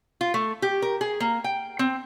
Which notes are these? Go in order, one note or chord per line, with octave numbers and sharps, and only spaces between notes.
F4
A3
G4
A#4
G#4
A#3
G5
C4